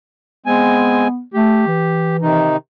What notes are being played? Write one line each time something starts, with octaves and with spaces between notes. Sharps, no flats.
G#3 B3 C4 G#5
A3 G4
E3
C3 D#3 D#4